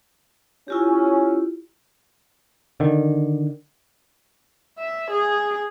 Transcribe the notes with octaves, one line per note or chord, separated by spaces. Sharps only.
C#4 E4 F4 G4
D3 D#3
E5
G#4